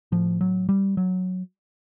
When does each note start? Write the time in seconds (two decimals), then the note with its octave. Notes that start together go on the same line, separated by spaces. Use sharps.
0.12 A2 F3
0.41 F#3
0.69 G3
0.97 F#3